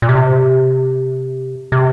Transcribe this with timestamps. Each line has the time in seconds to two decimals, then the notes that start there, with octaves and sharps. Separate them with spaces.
0.02 A#2
0.09 C3
1.72 C3